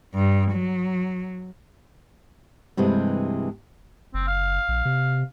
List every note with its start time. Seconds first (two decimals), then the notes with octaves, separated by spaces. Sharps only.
0.14 G2
0.52 F#3
2.77 G2 C3 E3 G#3 A3
4.14 F#1 C4
4.28 F5
4.68 A#1
4.85 C3